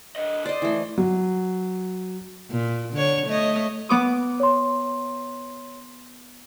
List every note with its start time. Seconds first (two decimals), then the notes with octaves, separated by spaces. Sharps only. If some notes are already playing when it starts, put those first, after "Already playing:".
0.16 D3 D#5
0.46 C5 D5 D#5
0.62 E3 A3
0.98 F#3
2.50 A#2
2.94 D3 C#5
3.27 A3 C#5 D#5
3.89 B3 D6 D#6
4.40 C#5 C6